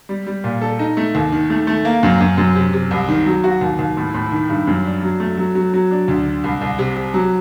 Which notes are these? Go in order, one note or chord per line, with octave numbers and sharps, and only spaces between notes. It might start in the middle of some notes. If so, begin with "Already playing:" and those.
G3
G3
A#2
A4
D#4
A3
D#2
D#3
A3
A3
A#3
F#2
F#2
F#2
C3
C3
C2
D#3
F#3
F#4
D#2
D#2
A2
A2
D#3
G2
F#2
D4
F#3
A3
F#3
F#3
F#3
D4
D2
D3
C2
C2
C3
C3
F#3